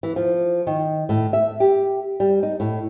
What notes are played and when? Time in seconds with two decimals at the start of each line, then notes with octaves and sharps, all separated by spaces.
0.03 E3
0.16 F3
0.67 D#3
1.09 A2
1.33 E5
1.60 G4
2.20 G3
2.43 D#4
2.60 A2